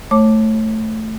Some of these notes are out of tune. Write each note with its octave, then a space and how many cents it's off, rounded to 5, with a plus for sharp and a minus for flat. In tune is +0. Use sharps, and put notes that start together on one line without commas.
A3 +0 C#5 -25 D6 +0